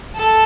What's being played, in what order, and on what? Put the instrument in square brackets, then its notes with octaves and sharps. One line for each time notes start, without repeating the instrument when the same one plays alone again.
[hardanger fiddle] A4